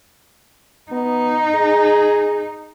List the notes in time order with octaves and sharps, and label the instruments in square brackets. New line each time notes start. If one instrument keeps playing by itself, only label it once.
[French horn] B3 [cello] D#4
[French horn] G#4